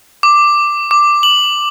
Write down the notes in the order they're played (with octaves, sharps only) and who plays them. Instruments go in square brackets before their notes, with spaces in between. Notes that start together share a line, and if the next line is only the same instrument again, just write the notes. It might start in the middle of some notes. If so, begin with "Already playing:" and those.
[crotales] D6
D6
F#7